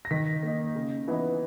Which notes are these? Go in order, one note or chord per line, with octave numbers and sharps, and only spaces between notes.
A#6
D#3 B6
A#3 D#4
C#3
E3 B3 D#4